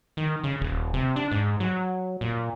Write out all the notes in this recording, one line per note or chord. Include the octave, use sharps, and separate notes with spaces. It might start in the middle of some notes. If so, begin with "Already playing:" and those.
D#3
C#3
D#1
C3
D4
G#2
F#3
A#2